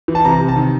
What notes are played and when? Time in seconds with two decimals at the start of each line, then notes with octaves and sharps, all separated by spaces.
0.08 E3
0.15 A5
0.25 C3 A#5
0.40 C3
0.48 A5
0.56 D#3